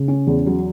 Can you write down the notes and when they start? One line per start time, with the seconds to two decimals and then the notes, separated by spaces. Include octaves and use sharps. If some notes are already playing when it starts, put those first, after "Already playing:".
Already playing: C#3
0.08 C#4
0.27 E2
0.46 F#3